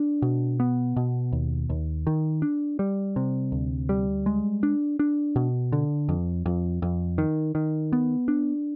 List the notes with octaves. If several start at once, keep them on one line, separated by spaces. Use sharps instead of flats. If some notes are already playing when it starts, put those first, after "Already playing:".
Already playing: D4
B2
B3
B2
D#2
D#2
D#3
D4
G3
C3
D2
G3
G#3
D4
D4
B2
D3
F2
F2
F2
D#3
D#3
B3
D4